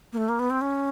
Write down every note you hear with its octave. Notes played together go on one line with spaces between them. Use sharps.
A#3
A3
A#3
B3
C4
C#4